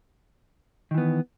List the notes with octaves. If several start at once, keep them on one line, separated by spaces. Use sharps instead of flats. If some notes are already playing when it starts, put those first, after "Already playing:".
D#3 E3 B3